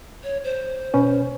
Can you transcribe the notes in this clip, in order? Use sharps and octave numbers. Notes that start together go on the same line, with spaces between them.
C#5
C5
B2 C#4 B4